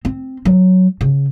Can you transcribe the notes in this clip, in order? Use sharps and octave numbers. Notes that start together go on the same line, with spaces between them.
C4
F#3
C#3